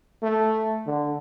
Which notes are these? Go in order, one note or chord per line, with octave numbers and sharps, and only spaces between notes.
A3
D3